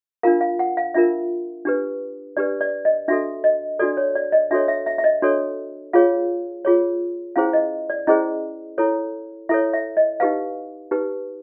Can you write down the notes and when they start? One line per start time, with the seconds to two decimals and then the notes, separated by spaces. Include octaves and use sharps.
0.23 D4 F4 A#4 F5
0.41 F5
0.59 F#5
0.77 F5
0.94 D4 F4 A#4 E5
1.65 D4 G4 B4
2.37 D4 G4 B4 D5
2.61 D5
2.85 D#5
3.08 D4 F#4 A4 E5
3.44 D#5
3.79 D4 F#4 A4 D5
3.97 C#5
4.15 D5
4.32 D#5
4.51 D4 F#4 A4 C#5 E5
4.68 E5
4.86 E5
4.98 E5
5.04 D#5
5.22 D4 F#4 A4 C#5
5.93 F4 G#4 C#5 F5
6.65 F4 G#4 C#5
7.36 C#4 E4 G#4 C5 F5
7.53 D#5
7.90 D5
8.07 C#4 E4 G#4 C5 D#5
8.78 E4 A4 C#5
9.49 E4 A4 C#5 E5
9.73 E5
9.97 D#5
10.20 D#4 G4 B4 F5
10.91 D#4 G4 B4